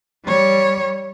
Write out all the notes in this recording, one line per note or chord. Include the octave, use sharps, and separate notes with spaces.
G3 C#5